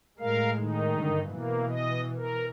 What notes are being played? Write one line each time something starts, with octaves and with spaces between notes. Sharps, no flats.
A2 G#3 A#4 F5
D#3 D#4
G2 D3
B2 E3 A#3
D#5
A#4